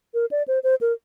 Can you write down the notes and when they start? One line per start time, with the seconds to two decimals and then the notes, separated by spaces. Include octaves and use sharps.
0.14 A#4
0.31 D5
0.48 C5
0.63 C5
0.81 A#4